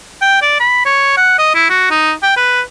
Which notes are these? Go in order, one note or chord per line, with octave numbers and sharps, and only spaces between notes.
G5
D5
B5
C#5
F#5
D#5
E4
F#4
D#4
G5
B4